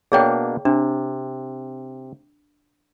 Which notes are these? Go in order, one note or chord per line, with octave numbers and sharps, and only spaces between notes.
B2 A#3 D4 G#4 C#5 G5
C3 D4